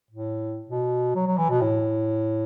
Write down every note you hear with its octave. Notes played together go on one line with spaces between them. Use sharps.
A2
B2
F#3
F#3
E3
B2
A2